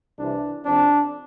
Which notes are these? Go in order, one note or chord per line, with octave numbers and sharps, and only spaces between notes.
C2 C3 E3 D4
F2 C3 F3 C4 D4